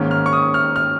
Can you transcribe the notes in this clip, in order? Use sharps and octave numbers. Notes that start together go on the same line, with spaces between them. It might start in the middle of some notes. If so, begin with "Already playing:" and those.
Already playing: G#2 D#3 A#3 C#4
F6
C#6
D#6
F6
F6